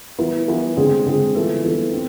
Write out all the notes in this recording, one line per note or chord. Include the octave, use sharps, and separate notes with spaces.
E3 B3 E4
E3 B3 E4
D3 G#3 C4 G#4
D3 G#3 C4 G#4
E3 B3 F4 A4
E3 B3 F4 A4
C4